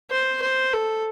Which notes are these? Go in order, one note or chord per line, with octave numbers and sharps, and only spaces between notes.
C5
C5
A4